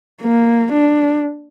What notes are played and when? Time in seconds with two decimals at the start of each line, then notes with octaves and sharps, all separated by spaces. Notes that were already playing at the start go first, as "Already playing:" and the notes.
0.22 A#3
0.72 D4